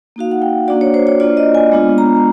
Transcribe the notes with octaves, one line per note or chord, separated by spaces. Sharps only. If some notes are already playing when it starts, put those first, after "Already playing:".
A#3 D#4 F#4 F5
F#5
G5
A#3 D4 F#4 D5
C#5
C5
C#5
A#3 D4 F4 D5
D#5
G#5
G#3 B3 D4 F4
A#5